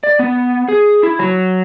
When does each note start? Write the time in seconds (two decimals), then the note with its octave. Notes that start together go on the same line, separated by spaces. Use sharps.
0.04 D5
0.19 B3
0.68 G#4
1.03 E4
1.19 F#3